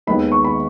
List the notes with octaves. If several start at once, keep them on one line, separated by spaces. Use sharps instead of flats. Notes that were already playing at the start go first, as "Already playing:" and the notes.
D#2 D#3 G#3 B3 B5
C#6
B5